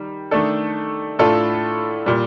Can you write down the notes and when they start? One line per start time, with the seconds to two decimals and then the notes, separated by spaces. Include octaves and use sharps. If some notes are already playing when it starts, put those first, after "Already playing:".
Already playing: D#3 G3
0.31 D#3 A3 D4 A4
1.19 A2 A3 D4 F4 A4
2.06 A#2 G3